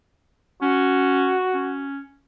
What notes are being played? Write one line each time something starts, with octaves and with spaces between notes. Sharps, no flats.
C#4 F#4
C#4